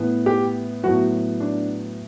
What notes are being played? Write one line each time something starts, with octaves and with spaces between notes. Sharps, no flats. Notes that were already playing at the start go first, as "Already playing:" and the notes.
Already playing: A2 E3 B3
G4
A2 F#3 B3 F#4
D4